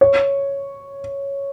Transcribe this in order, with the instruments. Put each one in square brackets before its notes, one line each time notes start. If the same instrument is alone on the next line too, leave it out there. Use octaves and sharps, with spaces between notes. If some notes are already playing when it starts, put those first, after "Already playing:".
[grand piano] C#5